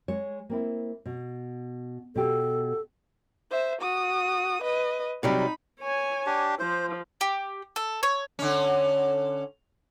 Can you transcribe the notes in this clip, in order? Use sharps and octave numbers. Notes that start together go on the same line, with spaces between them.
G#3 C#5
A#3 C4 E4
B2
B2 G4 A4
C5 E5
F#4 D#6
B4 D#5
C3 F#3 G3 D#4 B5
C#5 G#5
D4 G4
F3 C5
G4
A4
C#5
D3 C#4